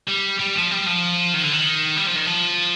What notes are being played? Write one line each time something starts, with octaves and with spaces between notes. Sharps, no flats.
G3
G3
F3
G3
F3
D#3
D3
D#3
G3
F3
D#3
F3